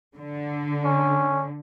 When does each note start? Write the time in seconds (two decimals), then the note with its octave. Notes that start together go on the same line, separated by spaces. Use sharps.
0.16 D3
0.85 C#4